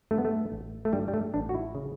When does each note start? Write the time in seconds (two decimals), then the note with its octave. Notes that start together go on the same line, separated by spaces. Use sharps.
0.11 G2 A3
0.18 B3
0.25 A3
0.52 A1
0.85 A3
0.93 G2 G3
1.08 G3
1.14 A3
1.34 A1 D4
1.49 F#4
1.55 E4
1.75 C#3